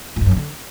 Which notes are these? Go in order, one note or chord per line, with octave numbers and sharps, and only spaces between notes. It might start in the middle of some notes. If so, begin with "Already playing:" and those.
A2
G2
F#2
G2
D3